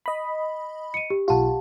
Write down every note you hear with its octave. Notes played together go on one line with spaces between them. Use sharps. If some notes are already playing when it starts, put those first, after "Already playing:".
D#5 B5
C#7 D#7
G4
B1 F4 G4 F#5 A5